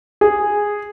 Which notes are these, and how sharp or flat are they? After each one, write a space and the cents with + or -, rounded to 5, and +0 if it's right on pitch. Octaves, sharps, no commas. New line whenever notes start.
G#4 -5